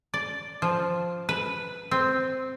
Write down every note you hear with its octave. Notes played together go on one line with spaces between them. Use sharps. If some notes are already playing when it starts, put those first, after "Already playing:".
D5
F3
B4
C4